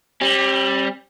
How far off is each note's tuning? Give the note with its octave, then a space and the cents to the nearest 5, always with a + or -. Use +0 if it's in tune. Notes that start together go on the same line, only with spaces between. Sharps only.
G3 +0 C4 +45